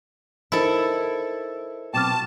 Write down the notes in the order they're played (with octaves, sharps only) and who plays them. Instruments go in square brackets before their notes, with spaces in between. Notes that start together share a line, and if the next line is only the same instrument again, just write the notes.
[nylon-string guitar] D#4 [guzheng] E4 A4 [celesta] A#4 C5 D#5
[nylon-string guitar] B2 F#3 C4 [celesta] G5 D6 F6 [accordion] A5